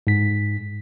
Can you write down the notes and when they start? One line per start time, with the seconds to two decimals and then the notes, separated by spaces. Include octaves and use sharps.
0.07 G#2 B6